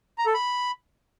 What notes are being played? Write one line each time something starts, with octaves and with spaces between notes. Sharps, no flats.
A#5
A4
B5